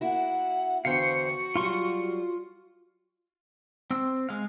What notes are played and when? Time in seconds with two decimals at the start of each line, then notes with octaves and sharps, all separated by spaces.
0.01 A#3 E4 F#4 F#5
0.85 E2 D3 F#4 C5 F5 G5 C#7
1.56 F#3 G3 F4 C6 C#6
3.91 C4 E6
4.29 G#3 F5